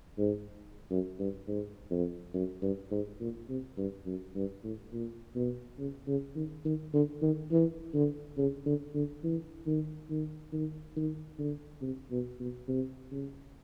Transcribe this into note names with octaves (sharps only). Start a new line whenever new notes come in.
G#2
F#2
G2
G#2
F2
F#2
G2
G#2
A#2
C3
G2
F#2
G2
A2
A#2
B2
C#3
C#3
D#3
D#3
D3
D#3
E3
D3
C#3
D3
D3
E3
D#3
D#3
D#3
D#3
D3
C3
B2
B2
C3
C#3